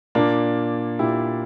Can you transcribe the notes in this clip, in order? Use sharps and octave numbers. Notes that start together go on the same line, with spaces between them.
A#2 A#3 D4
A#2 E4 G4